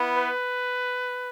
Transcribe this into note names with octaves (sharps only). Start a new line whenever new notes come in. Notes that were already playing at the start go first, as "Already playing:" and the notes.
Already playing: B3 E4
B4